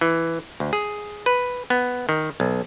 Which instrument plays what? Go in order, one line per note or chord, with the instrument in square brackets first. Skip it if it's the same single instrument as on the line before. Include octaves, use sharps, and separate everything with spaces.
[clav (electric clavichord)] E3
D2
G#4
B4
B3
D#3
B1